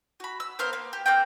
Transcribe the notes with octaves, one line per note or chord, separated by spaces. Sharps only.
F#4 B5
E6
B3 A#4 C5 F5
A#3
G4
A#3 C4 G5